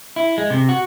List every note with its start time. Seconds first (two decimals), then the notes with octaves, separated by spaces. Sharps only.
0.16 E4
0.38 G#3
0.50 C3
0.69 F#4